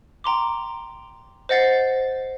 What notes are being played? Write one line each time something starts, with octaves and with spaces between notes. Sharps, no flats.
G5 A#5 C6 D6
C5 D#5 F#5 A6 C7